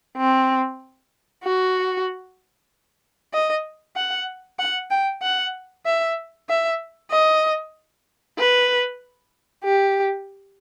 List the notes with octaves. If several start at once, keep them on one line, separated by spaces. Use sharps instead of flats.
C4
F#4
D#5
F#5
F#5
G5
F#5
E5
E5
D#5
B4
G4